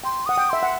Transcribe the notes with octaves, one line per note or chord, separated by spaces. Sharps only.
G5 C6
F#5 D#6
G5
E5 C6
F#5